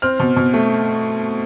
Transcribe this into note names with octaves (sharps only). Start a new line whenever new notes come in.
C4 F6
B2
B2
A3